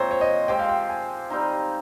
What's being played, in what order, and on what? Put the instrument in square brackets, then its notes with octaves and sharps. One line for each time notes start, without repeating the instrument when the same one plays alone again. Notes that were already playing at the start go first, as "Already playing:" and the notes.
Already playing: [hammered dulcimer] A#2 F3 G#3 C4 [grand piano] C5 C#5
[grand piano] C#5
D#5
[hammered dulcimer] F3 G#3 C4 G4 [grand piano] G5
[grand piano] F5
G5
G#5
[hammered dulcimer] G3 C4 D#4